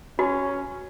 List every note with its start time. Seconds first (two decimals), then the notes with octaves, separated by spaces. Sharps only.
0.19 C#4 F#4